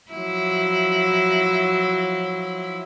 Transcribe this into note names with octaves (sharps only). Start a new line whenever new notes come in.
F3 F#3 E4